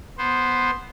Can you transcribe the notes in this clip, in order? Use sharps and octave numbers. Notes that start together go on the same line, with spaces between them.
B3 C5